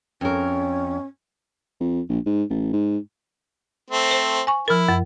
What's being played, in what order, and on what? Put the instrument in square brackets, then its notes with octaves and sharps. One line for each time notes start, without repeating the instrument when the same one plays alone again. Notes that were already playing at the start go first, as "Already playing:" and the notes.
[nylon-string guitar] F2 A#4 [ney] C#4
[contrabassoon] F2
A#1
G#2
A1
G#2
[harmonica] A3 C4
[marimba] C5
G#5 C#6
[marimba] F3 A#4 [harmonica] E4
[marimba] F#2